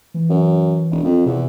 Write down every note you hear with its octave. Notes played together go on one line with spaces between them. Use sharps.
E3
F#2
E1
F2
E2 C3